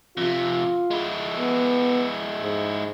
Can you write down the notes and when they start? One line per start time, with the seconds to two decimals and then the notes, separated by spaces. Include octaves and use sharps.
0.17 F2 C3 F4
0.91 G#3 E4
1.39 B3
2.42 G#2